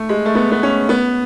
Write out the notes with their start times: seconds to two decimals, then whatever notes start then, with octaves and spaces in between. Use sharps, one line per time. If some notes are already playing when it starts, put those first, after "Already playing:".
Already playing: A3
0.09 G#3
0.25 A3
0.35 B3
0.52 B3
0.63 C#4
0.89 B3